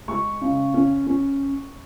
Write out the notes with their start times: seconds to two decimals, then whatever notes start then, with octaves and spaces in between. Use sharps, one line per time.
0.08 G#3 C#6
0.42 C#3
0.74 C#4
1.07 C#4